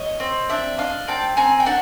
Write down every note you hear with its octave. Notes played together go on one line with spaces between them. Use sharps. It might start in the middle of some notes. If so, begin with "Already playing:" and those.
Already playing: C#5 D#5
C4
D4 D5 E5
D4 D#5 F5
C4 G5 A5
C4 G#5 A#5
G5
D4 F#5